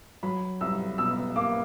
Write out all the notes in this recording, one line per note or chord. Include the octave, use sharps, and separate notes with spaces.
F#3 B5
C2 E6
B2 E6
A#3 D6